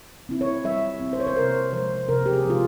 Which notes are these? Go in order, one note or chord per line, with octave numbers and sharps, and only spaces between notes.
C4 E4
C#5
G3 E5
C4 E4
C5
C#5
C5
C3 A#4
F3 G#3 C5
C3 A#4
G4
G#4
F3 G#3 F4